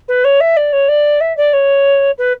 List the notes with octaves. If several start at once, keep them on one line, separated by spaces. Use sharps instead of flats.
B4
C#5
E5
D5
C#5
D5
E5
D5
C#5
B4